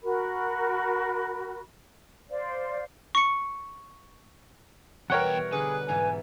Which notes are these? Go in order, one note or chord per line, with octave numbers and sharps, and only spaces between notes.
F#4 A#4 B5
C5 D5 F5
C#6 C#7
E2 B2 E3 G3 A#4 C#5 F#5 G5
D3 G#4 B4
G#2 B2 E3 G#5